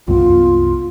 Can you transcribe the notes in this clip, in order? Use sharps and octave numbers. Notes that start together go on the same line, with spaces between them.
C2 F#2 B3 F4